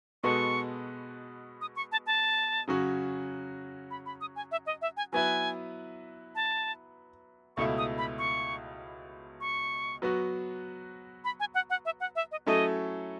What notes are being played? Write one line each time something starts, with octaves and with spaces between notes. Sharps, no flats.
B2 G#3 B3 F#4 A4 C#6
D#6
C#6
A5
A5
C#3 F#3 C#4 F#4
B5
B5
D#6
G#5
E5
D#5
E5
G#5
F#3 B3 E4 B4 G#5
A5
C#2 B2 A3 E4 C#6
D#6
B5
C#6
C#6
F#3 B3 F#4
B5
G#5
F#5
F#5
E5
F#5
E5
D#5
F#3 A3 C#4 E4 A4 D#5